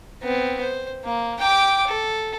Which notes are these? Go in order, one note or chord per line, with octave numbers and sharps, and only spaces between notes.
B3 C4
C5
A#3
G5 D6
A4